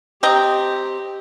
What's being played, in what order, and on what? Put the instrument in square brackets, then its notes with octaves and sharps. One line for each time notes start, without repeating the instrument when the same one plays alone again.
[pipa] C4 D#5 A#5 [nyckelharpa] G4